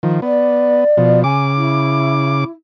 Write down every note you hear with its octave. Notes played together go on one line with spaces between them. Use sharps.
D#3 F3
B3 D5
B2 F3
C#3 G#5 D6
E4